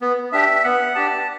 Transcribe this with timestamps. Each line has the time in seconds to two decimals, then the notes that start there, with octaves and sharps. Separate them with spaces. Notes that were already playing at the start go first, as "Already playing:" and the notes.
0.02 B3
0.32 D4 G4 E5
0.64 B3 F#5
0.95 D4 G4 A5